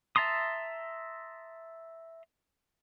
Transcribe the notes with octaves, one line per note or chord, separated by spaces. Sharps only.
E5 A5 A#5 C6 D#6